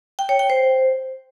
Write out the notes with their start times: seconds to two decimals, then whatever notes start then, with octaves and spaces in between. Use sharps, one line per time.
0.19 G5
0.29 C#5
0.39 G5
0.50 C5